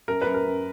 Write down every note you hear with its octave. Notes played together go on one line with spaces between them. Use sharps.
F#2 A#4
B4
F#2
A#4
F#2